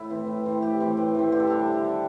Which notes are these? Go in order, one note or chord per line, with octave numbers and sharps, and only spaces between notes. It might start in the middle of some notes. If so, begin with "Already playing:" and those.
Already playing: A2 E4
E3 C4
A2
E3 C4
A2 G4
E3 C4
A2
E3 C4
D3 G4
A4
G3 D4 G4
D3
G3 D4